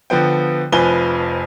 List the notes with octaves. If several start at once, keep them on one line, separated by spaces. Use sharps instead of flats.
D3 F3 B3 G5
F1 F2 F3 B4 G#5 G7